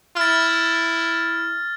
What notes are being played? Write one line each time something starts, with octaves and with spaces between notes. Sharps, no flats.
E4 F6 A6